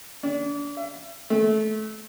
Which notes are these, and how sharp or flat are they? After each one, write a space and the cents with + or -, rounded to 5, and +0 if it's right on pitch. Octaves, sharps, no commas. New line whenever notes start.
D4 -35
E5 +30
A3 -25